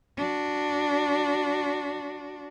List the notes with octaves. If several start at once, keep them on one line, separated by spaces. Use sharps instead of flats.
D4 F#4